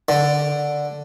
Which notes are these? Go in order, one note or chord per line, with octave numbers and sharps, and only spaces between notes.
D3